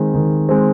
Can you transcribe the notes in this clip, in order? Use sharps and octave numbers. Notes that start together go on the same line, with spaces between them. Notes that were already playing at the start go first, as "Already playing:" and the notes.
Already playing: D#3 G#3 C4
D#3
G#3 C4